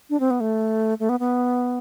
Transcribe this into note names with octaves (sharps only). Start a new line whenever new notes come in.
D4
C4
B3
A3
A3
B3
B3